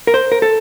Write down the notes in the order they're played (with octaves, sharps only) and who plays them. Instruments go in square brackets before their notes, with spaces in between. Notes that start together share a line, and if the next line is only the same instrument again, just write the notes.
[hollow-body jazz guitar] A#4
C5
A#4
A4